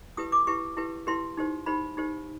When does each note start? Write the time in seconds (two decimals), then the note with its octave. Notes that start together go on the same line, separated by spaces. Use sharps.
0.17 E4 G4 B4 D#6
0.32 D6
0.47 E4 G4 B4 C#6
0.77 E4 G4 B4
1.07 E4 G4 B4 C6
1.37 D#4 G4 C5
1.66 D#4 G4 C5 B5
1.97 D#4 G4 C5